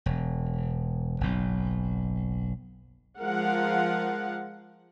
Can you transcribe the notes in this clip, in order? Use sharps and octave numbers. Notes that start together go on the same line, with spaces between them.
E1
F#1 B1
F3 G#3 A#4 F5 F#5